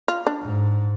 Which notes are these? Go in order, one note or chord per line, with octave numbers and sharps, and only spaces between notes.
F4
D4
G#2